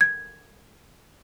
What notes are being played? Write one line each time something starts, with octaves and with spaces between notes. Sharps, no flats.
G#6